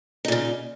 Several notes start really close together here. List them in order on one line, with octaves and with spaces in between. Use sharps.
D#4 A#2 C#3